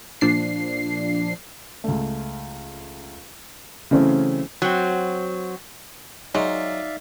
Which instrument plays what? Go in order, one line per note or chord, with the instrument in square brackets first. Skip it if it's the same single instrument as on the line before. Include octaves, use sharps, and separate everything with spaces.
[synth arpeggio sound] A#2 F3 D4 C7
[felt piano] C#2 A3
C#3 E3 F#3 A3 C4 C#4
[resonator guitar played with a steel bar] F#3 C4
[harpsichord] F#3 [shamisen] G#3 [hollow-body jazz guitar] D#4 [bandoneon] D5 E5 F5